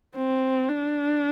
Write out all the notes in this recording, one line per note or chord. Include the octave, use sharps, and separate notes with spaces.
C4
D4